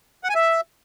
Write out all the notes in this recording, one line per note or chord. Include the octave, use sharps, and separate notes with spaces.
F#5
G#5
E5